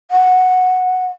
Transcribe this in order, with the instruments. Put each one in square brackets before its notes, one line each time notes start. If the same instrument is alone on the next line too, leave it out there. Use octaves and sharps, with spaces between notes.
[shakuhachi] F#5